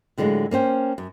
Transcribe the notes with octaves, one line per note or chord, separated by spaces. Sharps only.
A2 D3 F#3 G#3 F4
A#3 C#4 C5 G5
F#2